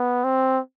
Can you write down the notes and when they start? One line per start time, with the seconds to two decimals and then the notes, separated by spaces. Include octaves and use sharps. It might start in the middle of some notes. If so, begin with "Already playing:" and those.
Already playing: B3
0.24 C4